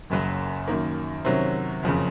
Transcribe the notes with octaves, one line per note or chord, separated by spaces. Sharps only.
F#1 F#2 C#3 F#3
F#2 D#3 A#3
C3 D#3 F#3 C#4
F#1 F2 C#3